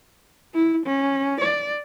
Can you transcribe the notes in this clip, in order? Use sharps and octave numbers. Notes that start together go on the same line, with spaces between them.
E4
C#4
D5